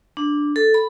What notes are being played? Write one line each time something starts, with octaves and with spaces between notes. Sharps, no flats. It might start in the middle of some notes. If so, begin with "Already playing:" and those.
D4
A4
B5